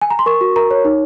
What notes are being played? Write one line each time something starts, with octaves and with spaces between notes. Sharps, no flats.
G#5
A#5
C6
A#4 C#6
F#4
A#4 A#5
C#5
D#4